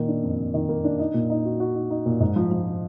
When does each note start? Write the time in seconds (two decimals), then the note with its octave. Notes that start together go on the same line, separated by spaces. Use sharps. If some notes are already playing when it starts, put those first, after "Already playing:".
Already playing: A#2 D#3 A#3
0.08 D4
0.23 F2
0.39 F2
0.54 D#3
0.69 A#3
0.84 D4
0.99 D#4
1.14 A#2
1.30 D#4
1.45 F#4
1.60 F#4
1.75 D#4
1.90 D#4
2.06 A#2
2.20 G#2
2.36 F3
2.51 F3